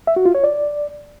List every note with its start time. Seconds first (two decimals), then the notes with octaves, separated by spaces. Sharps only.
0.07 E5
0.16 F#4
0.26 F4
0.35 C#5
0.44 D5